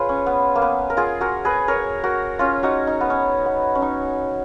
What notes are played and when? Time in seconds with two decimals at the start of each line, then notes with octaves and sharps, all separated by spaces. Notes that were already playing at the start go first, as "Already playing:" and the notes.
Already playing: F4 G#4 B4 C#5
0.09 C#4
0.26 B3
0.55 A#3
0.62 B3
0.90 A#4
0.97 F4 G#4
1.21 F#4 A#4
1.45 G#4 B4
1.68 A#4 C#5
2.04 F#4 A#4
2.39 C#4 F4
2.63 D#4 F#4
2.87 D#4
3.01 B3
3.10 C#4
3.46 B3
3.75 C#4
3.82 D#4